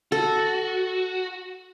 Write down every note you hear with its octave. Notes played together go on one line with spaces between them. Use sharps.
F#4 A4